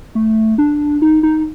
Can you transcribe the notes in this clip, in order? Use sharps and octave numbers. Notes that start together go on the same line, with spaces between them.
A3
D4
D#4
D#4